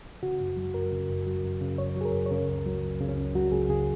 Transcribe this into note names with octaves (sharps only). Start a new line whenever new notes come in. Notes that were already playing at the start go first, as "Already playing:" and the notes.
C#3 F#4
F#2
F#3
F#2 A#4
C#3
F#2
F#3
F#2
C#3
F#2 C#5
F#3 G#4
A#4
F#2
C#5
C#3 A#4
C#2
F#3
C#2
C#3
C#4
C#2
F#3 F#4
C#2 G#4
C#3 G#4